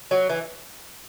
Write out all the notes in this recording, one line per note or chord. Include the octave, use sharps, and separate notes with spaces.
F#3
E3